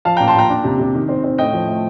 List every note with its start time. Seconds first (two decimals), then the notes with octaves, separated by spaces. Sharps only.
0.05 F3 F5 A5
0.16 A#2 G5 A#5
0.28 A5 C6
0.35 A#2 G5 A#5
0.50 D4
0.64 C3
0.80 C3
0.94 D#3
1.09 C4
1.24 C4
1.38 A2 D#5 G5
1.53 F3
1.68 A3